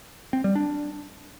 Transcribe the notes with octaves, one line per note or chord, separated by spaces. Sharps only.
C4
G3
D4